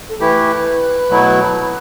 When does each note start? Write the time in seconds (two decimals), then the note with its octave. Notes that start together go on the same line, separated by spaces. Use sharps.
0.09 A4
0.20 E3 A3 E4 G4 B4
1.10 B2 F#3 A3 E4